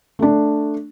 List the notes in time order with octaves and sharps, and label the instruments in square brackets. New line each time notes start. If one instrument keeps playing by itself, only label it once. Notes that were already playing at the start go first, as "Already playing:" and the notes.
[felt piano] A3 D4